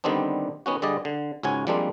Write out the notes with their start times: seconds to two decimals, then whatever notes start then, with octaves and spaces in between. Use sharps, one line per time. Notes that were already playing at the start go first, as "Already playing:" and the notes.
0.04 D3 D#3 G3 B3 C4 D4
0.66 D#3 B3 C#4 F#4
0.82 D3 G3 G#4 D5 D#5
1.05 D3
1.43 C#2 G#2 C#4 F#4 F#5 G#5
1.67 F3 G3 G#3 A#3 C4 D4